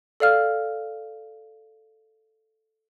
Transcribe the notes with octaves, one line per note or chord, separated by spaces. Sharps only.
A4 D5 F5 F6